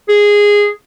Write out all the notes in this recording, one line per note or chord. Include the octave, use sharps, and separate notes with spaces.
G#4